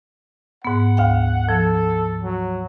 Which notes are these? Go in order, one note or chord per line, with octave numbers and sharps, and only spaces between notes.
G#2 B3 F#5
D2 F5 G5
F3 A4
F#3